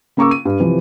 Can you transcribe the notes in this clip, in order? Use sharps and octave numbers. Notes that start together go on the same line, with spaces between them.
C#3 A#3 A#5 C#6 D6 E6
D#7
G2
C3 E3 F3